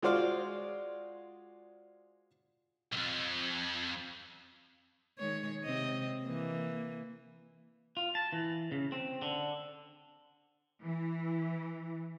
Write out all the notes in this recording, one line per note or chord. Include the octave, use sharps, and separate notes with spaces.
G#3 F4 F#4 C5 D5 F5
B1 F2
D#3 G#3 C#5
C3 C4 D#5
E3 A#3
F4
A5
E3
C#3
C4
D3
E3